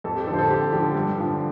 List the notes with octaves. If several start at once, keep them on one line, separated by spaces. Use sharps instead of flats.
F2 A4
G4
D3 F3 A4 C5
A4
F2 G4
D3 F3 G4
G2
D3 F3